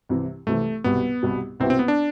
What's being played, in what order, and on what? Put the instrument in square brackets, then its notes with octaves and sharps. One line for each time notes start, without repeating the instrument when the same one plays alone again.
[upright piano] C2 C3 E3
[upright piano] C2 C3 E3 [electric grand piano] A3
[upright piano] C2 B2 G3 [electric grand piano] B3
[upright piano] C2 B2 G3
[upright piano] C2 B2 B3 E4 G4 [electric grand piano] C4
[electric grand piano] C4
B3
D4